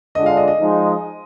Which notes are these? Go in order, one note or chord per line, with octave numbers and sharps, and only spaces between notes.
D3 G#3 D4 F4 D#5
F5
D#5
D#5
F3 G#3 D#4